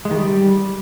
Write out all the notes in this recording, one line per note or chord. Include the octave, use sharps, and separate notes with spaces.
G#3
D#3
G3